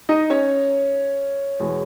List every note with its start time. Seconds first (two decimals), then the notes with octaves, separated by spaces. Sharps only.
0.09 D#4 D#5
0.30 C#4 C#5
1.60 E2 B2 G#3